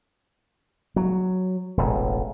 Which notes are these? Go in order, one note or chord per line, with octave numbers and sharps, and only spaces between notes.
F#3
E1 A1